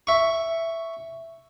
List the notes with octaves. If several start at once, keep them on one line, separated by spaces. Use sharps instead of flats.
E5 C#6